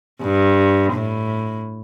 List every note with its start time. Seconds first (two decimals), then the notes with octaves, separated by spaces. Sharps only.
0.22 G2
0.93 A2